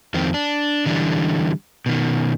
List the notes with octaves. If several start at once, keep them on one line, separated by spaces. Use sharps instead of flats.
F2 D#3 C4
D4
D3 E3 G3 D4
B2 D#3